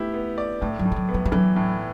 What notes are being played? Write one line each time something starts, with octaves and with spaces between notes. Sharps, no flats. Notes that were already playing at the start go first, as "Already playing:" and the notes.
Already playing: A3 B3 E4 G4
B3
D5
A2 A3
F#3
A2
G3
F#3
B3
F#3
G3
E3 F#3
A2